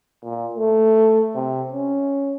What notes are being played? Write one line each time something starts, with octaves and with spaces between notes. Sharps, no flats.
A#2
A3
C3
C#4